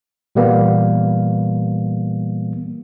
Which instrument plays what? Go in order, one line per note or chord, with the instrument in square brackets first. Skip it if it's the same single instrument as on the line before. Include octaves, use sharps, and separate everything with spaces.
[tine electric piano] A#2 E3 G3 A#3 B3